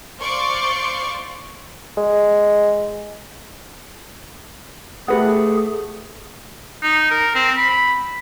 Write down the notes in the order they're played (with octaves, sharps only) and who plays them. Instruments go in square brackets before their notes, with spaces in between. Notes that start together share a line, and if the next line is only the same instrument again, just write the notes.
[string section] C5 D5 F5 C6 C#6
[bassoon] G#3
[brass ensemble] A3 [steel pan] G4 B4 F#5 [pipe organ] G#4
[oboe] D#4
A#4
C4
B5